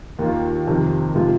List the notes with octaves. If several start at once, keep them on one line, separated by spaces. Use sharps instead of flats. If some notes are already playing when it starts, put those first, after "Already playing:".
D#2 D#3 A#3 F4
F2 C3 D#3
C3 F3 G#3 F4